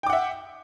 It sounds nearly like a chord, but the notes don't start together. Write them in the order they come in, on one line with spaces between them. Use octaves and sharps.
G5 D6 F#5 E5